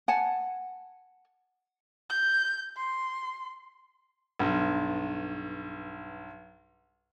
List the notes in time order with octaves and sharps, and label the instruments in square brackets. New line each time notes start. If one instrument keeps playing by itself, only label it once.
[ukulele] F#5 G#5 A5
[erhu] G6
C6
[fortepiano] B1 G2